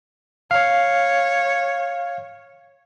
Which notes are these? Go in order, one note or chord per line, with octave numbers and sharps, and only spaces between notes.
C#5 F5